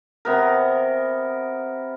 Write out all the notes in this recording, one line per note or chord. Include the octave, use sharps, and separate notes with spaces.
C3 B3 A#4